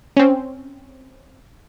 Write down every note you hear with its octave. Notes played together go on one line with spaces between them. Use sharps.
C4 C#4